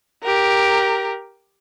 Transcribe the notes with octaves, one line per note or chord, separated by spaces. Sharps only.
G4 A#4